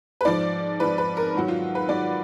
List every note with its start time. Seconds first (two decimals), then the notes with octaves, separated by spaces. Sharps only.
0.21 B4
0.25 G#2 F3 D5
0.80 G#2 F3 B4
0.98 B4
1.17 A#4
1.35 G#2 D#3 F#3 F#4
1.48 F4
1.75 B4
1.89 G#2 D#3 F#3 D5